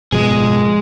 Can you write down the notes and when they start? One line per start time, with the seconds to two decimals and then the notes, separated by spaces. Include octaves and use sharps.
0.12 F#1 G#2 B2 F3 G#3 G#4